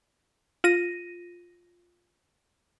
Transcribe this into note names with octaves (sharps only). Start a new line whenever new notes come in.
F4 A#6 D#7